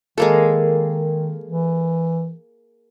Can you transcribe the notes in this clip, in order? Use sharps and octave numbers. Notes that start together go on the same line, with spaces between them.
D#3 G#3 A#3 A4
E3